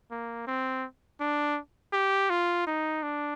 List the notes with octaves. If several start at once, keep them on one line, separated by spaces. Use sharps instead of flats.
A#3
C4
D4
G4
F4
D#4
D4